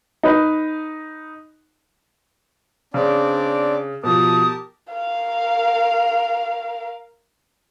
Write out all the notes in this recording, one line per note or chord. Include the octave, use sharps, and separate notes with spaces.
D#4 B4
C#3 C4 D4 D5
B2 F3 G4 A#4 A5 D#6
A#4 F5